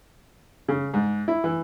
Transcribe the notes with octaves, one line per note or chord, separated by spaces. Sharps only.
C#3
G#2
E4
E3